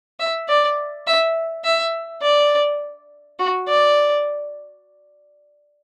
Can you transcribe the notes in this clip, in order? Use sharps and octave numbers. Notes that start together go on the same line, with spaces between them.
E5
D5
E5
E5
D5
F#4
D5